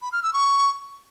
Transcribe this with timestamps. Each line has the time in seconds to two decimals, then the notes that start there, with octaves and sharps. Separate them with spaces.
0.02 B5
0.12 F6
0.23 E6
0.33 C#6